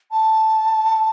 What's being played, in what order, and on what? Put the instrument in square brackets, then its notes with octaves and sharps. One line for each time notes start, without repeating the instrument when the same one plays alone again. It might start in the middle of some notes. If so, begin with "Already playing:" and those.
[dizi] A5